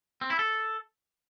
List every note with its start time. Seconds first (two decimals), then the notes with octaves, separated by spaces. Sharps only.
0.21 C4
0.30 E4
0.39 A4